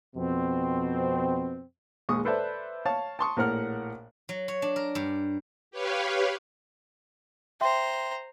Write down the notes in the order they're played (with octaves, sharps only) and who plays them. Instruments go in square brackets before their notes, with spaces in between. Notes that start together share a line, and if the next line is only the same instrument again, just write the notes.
[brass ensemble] F2 B2 C4
[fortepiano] A#1 D#2 G#3 C#6 D#6
A4 B4 C5 D5 E5 A5
C#5 F5 A5 C#6
A5 C6 C#6 D#6
A#1 A2 A#4 F#5 F6
[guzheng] F#3
C#5
D4
A#4
G2
[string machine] G4 B4 C#5 F5
[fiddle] C5 A#5 [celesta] E5 G5 C6